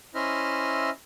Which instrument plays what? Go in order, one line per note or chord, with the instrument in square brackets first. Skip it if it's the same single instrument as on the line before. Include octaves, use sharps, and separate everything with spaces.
[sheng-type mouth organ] C#4 E4 C5 D#5 E5 F6